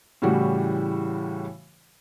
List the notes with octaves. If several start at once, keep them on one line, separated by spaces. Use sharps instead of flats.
A2 C#3 E3 G3 F#4